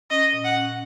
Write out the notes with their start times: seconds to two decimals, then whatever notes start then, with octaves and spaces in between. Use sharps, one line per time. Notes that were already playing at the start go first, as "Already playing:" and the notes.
0.10 C#4 D#5
0.33 A#2
0.44 F#5
0.56 C#4